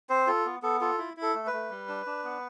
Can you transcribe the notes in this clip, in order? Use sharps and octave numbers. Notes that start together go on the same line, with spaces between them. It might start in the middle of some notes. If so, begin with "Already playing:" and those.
C4 C5
F4 A4
B3
B3 A4
F4 A4
E4
E4
A4
A3
B4
A3
G3
D4
D4
B3